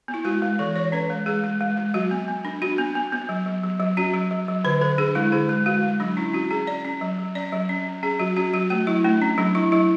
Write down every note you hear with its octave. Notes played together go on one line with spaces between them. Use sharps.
B3
E4
G#3 F#4
G#3
E3 A4
E3 C#5
C#4 B4
G#3
G#3 G#4
G#3
G#3
G#3
F#3 F#4
B3
B3
D4
D4 F#4
B3
B3
B3
F#3
F#3
F#3
F#3
C#4 F#4
F#3
F#3
F#3
D3 B4
D3 A4
D4 G#4
G#3 E4
D3 G#4
G#3
G#3 F#4
G#3
F#3 D4
C#4 E4
C#4 F#4
C#4 G#4
C#4 D5
C#4
F#3
F#3
C#4 D5
F#3
C#4
C#4
C#4 G#4
F#3 F#4
C#4 F#4
F#3 F#4
A3 F#4
F#3 E4
A3 D4
C#4
F#3 D4
F#3 E4
F#3 E4